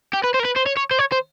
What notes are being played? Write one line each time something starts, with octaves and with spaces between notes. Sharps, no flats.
G4
B4
C5
A#4
B4
C5
C#5
C#5
C5
C#5
C5